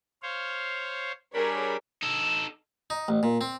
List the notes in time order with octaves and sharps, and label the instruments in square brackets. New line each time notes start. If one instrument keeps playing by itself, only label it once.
[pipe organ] C5 C#5 F5
[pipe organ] G3 D4 B5 [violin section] G#4 A#4 C#5
[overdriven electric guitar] D#4 A4
[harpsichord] D#4
A1
A#2
C4